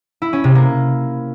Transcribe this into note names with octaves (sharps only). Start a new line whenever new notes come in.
E4
C#4
C3
A#3